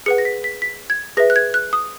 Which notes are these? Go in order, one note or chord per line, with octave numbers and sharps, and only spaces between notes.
G#4 B4 F#5 C#7
A#6
B6
B6
B6
G#6
G#4 B4 E5 A#6
F#6
G#6
F#6
D#6